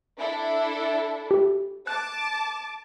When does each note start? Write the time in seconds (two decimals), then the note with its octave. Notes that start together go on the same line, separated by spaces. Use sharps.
0.17 D4 E4 A4
1.31 G4
1.87 A5 D6 F#6